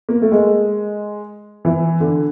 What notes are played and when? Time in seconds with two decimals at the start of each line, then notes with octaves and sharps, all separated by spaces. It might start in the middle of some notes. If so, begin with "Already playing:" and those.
0.09 A#3
0.22 A3
0.32 G#3
1.65 E3
2.00 D3